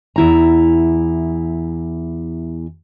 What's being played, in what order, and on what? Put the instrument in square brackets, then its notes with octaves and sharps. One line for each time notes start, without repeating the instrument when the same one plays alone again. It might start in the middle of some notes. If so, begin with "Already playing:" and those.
[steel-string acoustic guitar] E2 E4 A#5